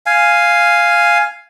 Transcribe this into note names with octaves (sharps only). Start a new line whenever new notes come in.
F5 G#5